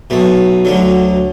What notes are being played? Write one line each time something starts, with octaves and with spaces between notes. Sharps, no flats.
B1 B2 A3
D2 D3 F#3